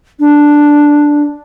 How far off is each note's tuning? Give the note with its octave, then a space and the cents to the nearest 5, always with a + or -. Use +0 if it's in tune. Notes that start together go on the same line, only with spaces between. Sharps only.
D4 +0